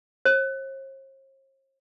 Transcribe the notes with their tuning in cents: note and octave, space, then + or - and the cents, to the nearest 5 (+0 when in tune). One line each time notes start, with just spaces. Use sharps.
C5 +45